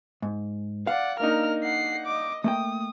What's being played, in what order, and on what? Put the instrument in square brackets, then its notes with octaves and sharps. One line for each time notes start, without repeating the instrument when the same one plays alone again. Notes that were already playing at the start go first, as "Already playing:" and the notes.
[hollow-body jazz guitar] G#2
[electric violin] D5 F#5 [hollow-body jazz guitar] F5
[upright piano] A#3 D4 D#4 [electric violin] A#4 F6
[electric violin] F#5 C7
D#5 D6
[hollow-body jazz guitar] A3 A#3 G5 [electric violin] D#6